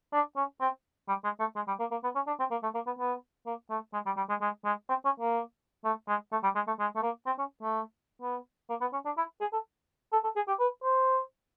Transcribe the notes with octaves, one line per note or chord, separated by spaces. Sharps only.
D4
C#4
C4
G3
G#3
A3
G#3
G3
A#3
A#3
B3
C#4
D4
C4
A#3
A3
A#3
B3
B3
A#3
A3
G#3
G3
G3
G#3
G#3
G#3
C4
C#4
A#3
A3
G#3
A3
G3
G#3
A3
G#3
A3
A#3
C4
C#4
A3
B3
A#3
B3
C#4
D4
E4
G#4
A4
A4
A4
G#4
G4
B4
C5